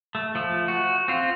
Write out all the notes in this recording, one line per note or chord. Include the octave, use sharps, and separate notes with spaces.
A3
F3 A3
F#4
C4 F4